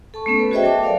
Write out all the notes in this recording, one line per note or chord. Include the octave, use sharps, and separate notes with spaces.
A4 A5 C#6
A3 B3 C#4 A4
B4 C#5
F#4 G#4 C5 D#5 E5 G5
F#3 A4 A5 D6
A#4 D5 F5